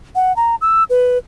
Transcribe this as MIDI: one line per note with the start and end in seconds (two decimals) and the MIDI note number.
0.15 0.35 78
0.36 0.55 82
0.61 0.83 88
0.90 1.18 71